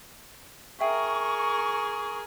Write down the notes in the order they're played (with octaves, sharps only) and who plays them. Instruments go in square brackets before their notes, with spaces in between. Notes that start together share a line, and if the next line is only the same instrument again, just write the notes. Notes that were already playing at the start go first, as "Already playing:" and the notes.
[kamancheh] G#4 A#4 [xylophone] E5 G5 C7 [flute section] C#6